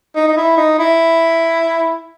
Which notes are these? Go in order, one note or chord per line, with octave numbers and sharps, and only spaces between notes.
D#4
D#4
E4
D#4
E4